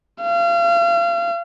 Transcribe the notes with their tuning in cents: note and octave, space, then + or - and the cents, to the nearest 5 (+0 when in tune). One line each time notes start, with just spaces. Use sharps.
F5 -35